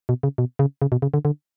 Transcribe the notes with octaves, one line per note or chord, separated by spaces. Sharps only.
B2
C#3
B2
C#3
C#3
B2
C#3
D3
D3